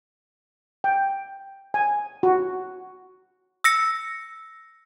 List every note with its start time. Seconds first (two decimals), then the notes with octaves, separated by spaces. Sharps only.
0.84 G5
1.74 G#5
2.23 F#4
3.64 E6 A#6 C#7